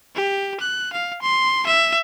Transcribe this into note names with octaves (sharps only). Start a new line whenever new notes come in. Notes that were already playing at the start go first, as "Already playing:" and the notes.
G4
F#6
F5
C6
E5